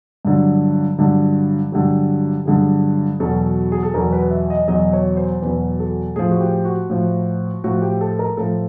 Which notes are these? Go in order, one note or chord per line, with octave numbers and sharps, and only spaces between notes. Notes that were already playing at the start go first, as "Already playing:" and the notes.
G2 D3 F#3
G2 D3 F#3
G2 D3 F#3 G4
G2 D3 F#3 G#4
E2 B2 F#3 A4
G#4
A4
E2 B2 F#3 A#4
B4
E5
D#5
E2 B2 F#3 D#5
C#5
C5
E2 B2 F#3 B4
A4
A2 F3 G#4
F#4
G4
F#4
A2 F3
A2 F3 F#4
G4
A4
A#4
A2 F3 A4